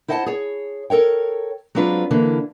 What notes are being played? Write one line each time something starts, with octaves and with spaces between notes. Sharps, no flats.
E4 C5 D#5 F#5 G5 A5
G#4 C#5
A4 A#4 C#5 G5
F#3 G#3 C4 D4 F4 B4
D3 E3 A#3 D4